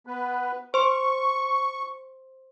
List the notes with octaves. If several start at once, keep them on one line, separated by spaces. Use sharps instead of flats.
B3 B4
C5 C6 C#6